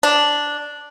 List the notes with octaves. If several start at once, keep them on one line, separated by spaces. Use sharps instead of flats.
D4